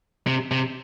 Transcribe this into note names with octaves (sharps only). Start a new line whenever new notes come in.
C3
C3